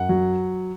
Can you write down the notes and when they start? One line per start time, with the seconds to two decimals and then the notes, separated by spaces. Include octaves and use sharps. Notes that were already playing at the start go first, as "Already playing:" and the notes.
Already playing: F#2 F#5
0.09 F#3